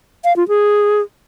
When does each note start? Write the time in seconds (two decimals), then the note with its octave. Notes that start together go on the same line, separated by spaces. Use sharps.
0.25 F5
0.36 F4
0.48 G#4